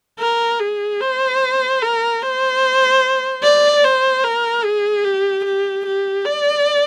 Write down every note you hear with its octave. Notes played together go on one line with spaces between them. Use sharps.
A#4
G#4
C5
A#4
C5
D5
C5
A#4
G#4
G4
G4
G4
D5